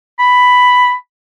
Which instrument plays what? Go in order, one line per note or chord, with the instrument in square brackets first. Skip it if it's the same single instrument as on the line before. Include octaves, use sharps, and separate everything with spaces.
[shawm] B5